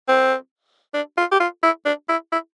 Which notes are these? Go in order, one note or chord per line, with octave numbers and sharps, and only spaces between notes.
C4
D4
F4
G4
F4
E4
D4
E4
E4